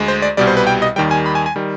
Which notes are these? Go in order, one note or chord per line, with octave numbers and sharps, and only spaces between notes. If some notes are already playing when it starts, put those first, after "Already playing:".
Already playing: D2 G#3
C5
D5
C2 B2 G3 D5
C5
B4
G5
D#5
D#2 D#3 G3 G5
G#5
B5
G#5
G#5
D#3 G3